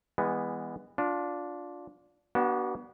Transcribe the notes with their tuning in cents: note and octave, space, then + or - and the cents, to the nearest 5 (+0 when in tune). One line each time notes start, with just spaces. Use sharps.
E3 +0 G#3 -30 B3 +0
D4 -10 F4 +20
B3 -30 D4 +0 F#4 +35